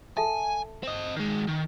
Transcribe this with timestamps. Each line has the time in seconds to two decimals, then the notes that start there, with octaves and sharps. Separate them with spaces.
0.17 A4 E5 G#5 A5
0.83 C4 D#5
1.16 D#3 G#3
1.47 D#3